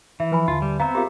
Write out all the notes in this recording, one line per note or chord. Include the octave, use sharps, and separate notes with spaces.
E3 E5
F3 B4 G#5 B5
D#2 D3 F4 A5
G3
B3 C4 E5 F5 A#5
F4 G4 G#4 A#4 F5 A#5